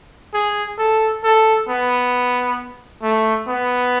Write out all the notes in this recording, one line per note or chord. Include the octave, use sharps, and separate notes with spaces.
G#4
A4
A4
B3
A3
B3